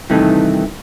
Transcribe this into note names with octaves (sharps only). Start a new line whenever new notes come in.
G2 C3 D#3 E3 A3 D#4